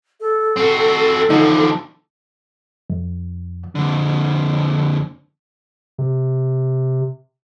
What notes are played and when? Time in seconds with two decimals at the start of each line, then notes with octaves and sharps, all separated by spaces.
0.20 A4
0.56 C4 F#4
1.30 E2 D3 F3 D#4
2.90 F2
3.75 F2 D3
5.98 C3